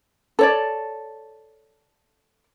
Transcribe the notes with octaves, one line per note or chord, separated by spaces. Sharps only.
A4 C#5 D5